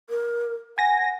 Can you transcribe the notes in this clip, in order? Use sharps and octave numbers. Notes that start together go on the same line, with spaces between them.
A#4
F#5 G#5 A#6